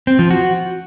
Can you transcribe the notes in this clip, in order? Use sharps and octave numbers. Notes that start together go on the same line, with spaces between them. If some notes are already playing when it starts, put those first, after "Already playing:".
C4
F3
F#4